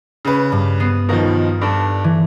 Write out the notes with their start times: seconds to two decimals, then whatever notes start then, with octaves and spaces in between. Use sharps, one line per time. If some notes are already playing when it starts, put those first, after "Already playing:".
0.25 C#3 B4
0.52 G2
0.80 B3 C7
1.09 B2 D#3 F3 A#4 F5 A#6
1.61 G2 A4 D5
2.04 E3